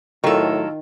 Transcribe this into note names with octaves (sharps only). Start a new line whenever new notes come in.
A2 D#3 F#3 F4 A4 A#4